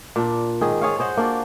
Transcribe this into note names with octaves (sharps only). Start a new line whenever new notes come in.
A#2 D4
G#2 D#3 G#4
F4 G#4 C#5 F5
G#4 C5 D#5 F#5
A#3 D4 F4 F#4